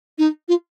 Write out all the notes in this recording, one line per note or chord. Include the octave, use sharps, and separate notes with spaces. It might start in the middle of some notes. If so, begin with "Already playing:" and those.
D#4
F4